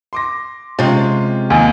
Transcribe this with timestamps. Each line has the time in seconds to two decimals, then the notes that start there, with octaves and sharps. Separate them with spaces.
0.13 C6 D6 A#6
0.79 C3 G#3 C#4 F4
1.50 D#2 G#5